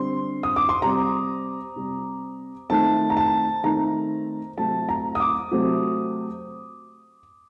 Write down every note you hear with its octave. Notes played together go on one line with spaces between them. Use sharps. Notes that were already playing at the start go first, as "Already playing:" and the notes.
Already playing: D3 G3 C4 C6
D#6
D6
C6
C3 G3 C4 A#5
C3 G3 C4
D#3 A3 C4 A5
A#5
A5
D#3 A3 C4 A#5
C3 F#3 A3 C4 A5
A#5
D#6
D6
C3 F#3 A3 C4